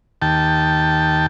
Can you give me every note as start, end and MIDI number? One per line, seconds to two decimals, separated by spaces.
0.22 1.26 39
0.22 1.26 79
0.22 1.26 81